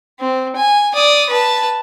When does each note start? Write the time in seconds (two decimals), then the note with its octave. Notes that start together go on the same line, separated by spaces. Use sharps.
0.20 C4
0.56 G#5
0.94 D5 D#6
1.30 B4 A5